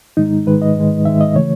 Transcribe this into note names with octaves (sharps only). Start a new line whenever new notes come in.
G#2 D#3 G#3 D#4
G#2 D#3 G#3 B4
D#5
G#2 D#3 G#3
G#2 D#3 G#3 E5
D#5
C#3 E3 A3 C#5